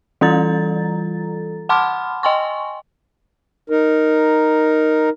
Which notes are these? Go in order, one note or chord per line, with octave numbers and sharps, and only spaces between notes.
E3 G3 F4 A4 A#5 A6
F#5 A5 B5 C6 D6 F6
D#5 G5 G#5 C6 C#6
D#4 A#4